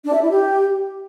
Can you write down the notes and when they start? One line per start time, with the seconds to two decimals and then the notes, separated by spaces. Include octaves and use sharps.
0.05 D4
0.13 E5
0.22 E4
0.30 G4